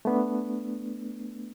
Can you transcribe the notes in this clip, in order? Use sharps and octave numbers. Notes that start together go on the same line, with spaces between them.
A3 B3 D4